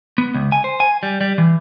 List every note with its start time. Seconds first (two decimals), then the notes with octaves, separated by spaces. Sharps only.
0.18 B3
0.34 C#2
0.52 G#5
0.64 C5
0.80 G#5
1.03 G3
1.21 G3
1.38 E3